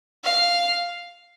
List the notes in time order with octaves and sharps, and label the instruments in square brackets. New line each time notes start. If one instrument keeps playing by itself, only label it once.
[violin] F5